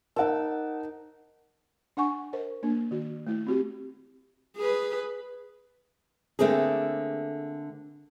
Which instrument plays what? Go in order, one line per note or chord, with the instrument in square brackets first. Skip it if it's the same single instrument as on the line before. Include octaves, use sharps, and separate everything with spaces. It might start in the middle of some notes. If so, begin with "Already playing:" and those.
[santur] D#4 D6 E6 [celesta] A#4 C5 [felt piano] F#5 A5
[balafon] D4 F#5 G#5 C#6
A#4 C5 D#5
A#3 D4
D#3 F#4
A3 E4
C4 F#4 G4
[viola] G#4 B4
[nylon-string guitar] D3 A3 A#3 C4 G#4